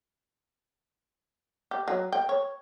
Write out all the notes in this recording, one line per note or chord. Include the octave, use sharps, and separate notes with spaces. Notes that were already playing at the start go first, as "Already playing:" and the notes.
G4
F#3
G5
C#5